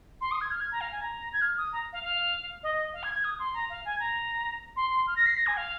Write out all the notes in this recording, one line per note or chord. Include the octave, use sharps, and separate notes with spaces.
C6
D#6
G#6
F6
G#6
A#5
F5
G#5
A#5
G#6
F6
D#6
A#5
F5
F5
D#5
F5
G#6
G#6
D#6
C6
A#5
F5
G#5
A#5
C6
C6
F6
A#6
C7
A#6
G#5
F5